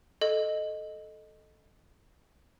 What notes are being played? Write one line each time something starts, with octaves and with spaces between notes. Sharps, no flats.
A4 D#5